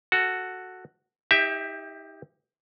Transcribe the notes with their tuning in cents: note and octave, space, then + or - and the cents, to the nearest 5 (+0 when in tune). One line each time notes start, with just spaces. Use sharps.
F#4 +0 A4 +10
D#4 +40 G4 +15 E5 +0